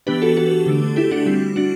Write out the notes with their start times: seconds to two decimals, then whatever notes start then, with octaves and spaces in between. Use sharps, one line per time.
0.07 E3 B3 D4 G4 B4
0.22 F#4 A4
0.37 F#4 A4
0.66 D3 A3 D4
0.96 E4 G4
1.11 D4 F#4
1.26 G3 C4 E4
1.56 D4 F#4